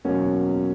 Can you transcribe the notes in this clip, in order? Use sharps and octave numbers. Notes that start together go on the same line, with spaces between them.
E2 B2 F#3 A#3 C#4